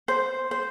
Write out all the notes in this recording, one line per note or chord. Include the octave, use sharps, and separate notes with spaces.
C5
C5